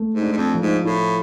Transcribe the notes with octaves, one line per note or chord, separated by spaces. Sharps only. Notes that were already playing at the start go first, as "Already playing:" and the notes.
Already playing: A3
G#2
D4
G#2
F2
F3
G#2
A2 E4